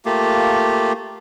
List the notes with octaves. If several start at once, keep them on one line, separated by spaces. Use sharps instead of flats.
A3 A#3 F4 G4